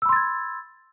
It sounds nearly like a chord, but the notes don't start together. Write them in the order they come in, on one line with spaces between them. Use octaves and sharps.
E6 B5 C6 A6 G#6